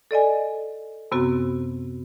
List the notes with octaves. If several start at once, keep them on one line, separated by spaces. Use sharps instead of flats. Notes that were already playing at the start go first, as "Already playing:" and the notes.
A4 D5 D#5 G#5
F#2 C3 B3 C4 F#4